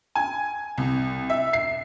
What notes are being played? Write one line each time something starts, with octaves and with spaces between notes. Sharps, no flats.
G#5
C2
E5
C7